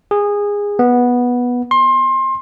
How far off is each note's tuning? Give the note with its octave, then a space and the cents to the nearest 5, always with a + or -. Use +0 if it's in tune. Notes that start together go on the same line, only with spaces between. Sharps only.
G#4 -20
B3 -10
C6 +25